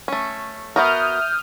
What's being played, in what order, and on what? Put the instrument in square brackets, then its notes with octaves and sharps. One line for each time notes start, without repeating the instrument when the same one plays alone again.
[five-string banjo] A3 C#4
[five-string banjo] B3 F#4 A#4 [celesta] E5 [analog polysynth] D#6 F6 G6